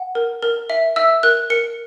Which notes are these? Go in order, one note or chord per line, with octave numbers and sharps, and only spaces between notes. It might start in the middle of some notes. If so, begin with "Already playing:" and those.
Already playing: F#5
A#4
A#4
E5
E5 E6
A#4 F#6
A#4 C#7